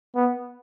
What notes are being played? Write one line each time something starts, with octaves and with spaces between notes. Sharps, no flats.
B3